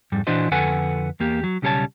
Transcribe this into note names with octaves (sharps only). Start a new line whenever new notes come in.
F2 G#2 G3
A#2 E3 D4 F#4 C5 D#5
F2 D3 A4 B4 F#5 G#5
E2 A#3 G4
F#3
B1 C#3 G3 A4 C#5 A5